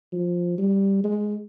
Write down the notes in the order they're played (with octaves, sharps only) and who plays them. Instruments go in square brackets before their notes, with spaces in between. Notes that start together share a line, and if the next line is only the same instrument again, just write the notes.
[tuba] F3
G3
G#3